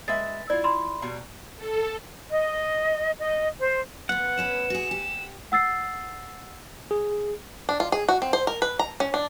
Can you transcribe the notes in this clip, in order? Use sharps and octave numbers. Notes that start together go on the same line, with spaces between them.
G#3 B4 E5 A6
E4 F4 D5
B5 C6
B2 G3 A#5
A4
D#5
D#5
C5
B3 F4 F#5
B3 C#4 B4 E7
F#4 G#4
G4
F#5 E6 A6 C7
G#4
D4
F4
G#4
F#4
C4
C5
A#4
B4
A#5
C#4
D4